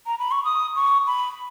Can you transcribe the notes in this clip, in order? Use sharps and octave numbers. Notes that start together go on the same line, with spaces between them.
A#5
B5
C#6
D#6
C#6
B5